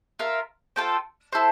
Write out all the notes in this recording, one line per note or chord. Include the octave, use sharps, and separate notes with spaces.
F4 A#4 E5
F4 A4 C5 G5
E4 A4 C5